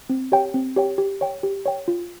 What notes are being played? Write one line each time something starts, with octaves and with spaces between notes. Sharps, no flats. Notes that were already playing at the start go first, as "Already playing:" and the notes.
C4
G4 C#5 G5
C4
G4 C#5 G5
G4
C#5 G5
G4
C#5 G5
F4